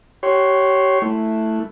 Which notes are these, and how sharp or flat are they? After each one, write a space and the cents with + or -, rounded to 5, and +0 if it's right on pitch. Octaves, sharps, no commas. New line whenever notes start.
G4 -30 C#5 +0 C6 +0
A3 +0 E4 +0